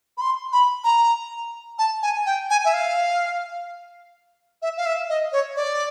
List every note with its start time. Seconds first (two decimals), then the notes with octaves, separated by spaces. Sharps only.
0.17 B5
0.21 C6
0.52 B5
0.84 A#5
1.78 A5
2.02 G#5
2.26 G5
2.50 G#5
2.65 E5
2.73 F5
4.62 E5
4.77 F5
4.86 E5
5.09 D#5
5.32 C#5
5.56 D5